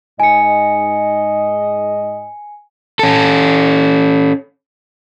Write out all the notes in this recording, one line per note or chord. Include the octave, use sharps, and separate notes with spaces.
G#2 D#5 G#5 C#7
C#4 A4